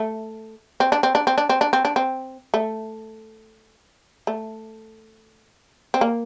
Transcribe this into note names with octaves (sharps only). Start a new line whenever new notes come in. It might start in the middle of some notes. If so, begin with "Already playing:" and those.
Already playing: A3
C4
D4
C4
D4
C4
D4
C4
D4
C4
D4
C4
A3
A3
C4
A#3